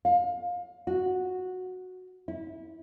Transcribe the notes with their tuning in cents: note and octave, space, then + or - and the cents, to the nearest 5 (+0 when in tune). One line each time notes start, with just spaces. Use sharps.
F5 +25
F#4 -5
E4 -25